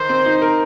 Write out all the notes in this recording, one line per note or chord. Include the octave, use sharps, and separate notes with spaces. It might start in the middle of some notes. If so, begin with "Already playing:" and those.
Already playing: D#3 D#4 C5
C4
D#4
A#4